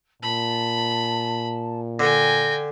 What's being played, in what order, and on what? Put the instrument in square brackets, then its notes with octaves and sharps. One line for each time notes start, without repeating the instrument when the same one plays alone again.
[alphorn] A#2 [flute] A5 [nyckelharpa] B5
[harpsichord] D3 [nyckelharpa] G5 G#5 [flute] A#6